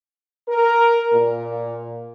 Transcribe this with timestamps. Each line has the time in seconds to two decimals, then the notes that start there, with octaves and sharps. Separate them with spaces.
0.49 A#4
1.13 A#2